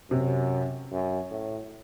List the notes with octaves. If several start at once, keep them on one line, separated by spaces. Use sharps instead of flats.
F#2 C3
F#2
A2